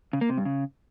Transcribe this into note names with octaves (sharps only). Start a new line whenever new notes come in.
C#3
A#3
C3
G2
C#3